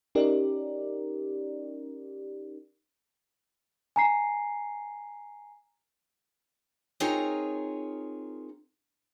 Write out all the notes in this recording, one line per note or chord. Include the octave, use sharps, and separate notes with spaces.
C#4 D#4 G4 A#4 D5
G#5 A#5 C7
C4 D#4 F4 G#4 A#4 C#5